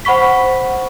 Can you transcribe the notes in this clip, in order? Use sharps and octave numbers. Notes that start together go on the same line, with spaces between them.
C5 F#5 B5 C#6 B6